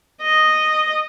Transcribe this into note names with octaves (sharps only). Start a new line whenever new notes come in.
D#5